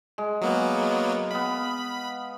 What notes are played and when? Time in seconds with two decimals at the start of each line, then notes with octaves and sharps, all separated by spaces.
0.18 G#3
0.42 F#3 A#3 B3
1.31 B3 F5 B5